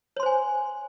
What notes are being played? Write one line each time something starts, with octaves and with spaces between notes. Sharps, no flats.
C5 C#5 G#5 C6